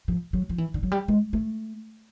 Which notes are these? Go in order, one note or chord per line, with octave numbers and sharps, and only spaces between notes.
F3
F#3
F3
E3
D3
F#3
G3
G#3
A3